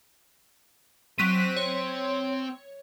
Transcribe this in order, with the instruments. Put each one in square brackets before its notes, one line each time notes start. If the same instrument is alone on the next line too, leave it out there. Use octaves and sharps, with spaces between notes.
[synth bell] F#3 B6 D#7 [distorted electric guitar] C4
[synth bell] C#5